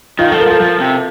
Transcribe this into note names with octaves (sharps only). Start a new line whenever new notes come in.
D#3 F4
A4
F3
A#4
F3 A4
F3 A4
C3